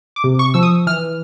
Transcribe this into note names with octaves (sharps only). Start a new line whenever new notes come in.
D6
C3
C#6
F3 E6
D#6
E3 F6